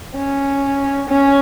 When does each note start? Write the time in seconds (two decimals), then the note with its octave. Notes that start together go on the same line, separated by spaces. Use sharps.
0.16 C#4
1.10 C#4